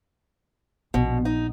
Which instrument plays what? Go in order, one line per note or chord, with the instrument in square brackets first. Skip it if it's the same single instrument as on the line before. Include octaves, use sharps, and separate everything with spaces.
[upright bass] A#1 [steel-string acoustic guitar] B2
[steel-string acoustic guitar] D#4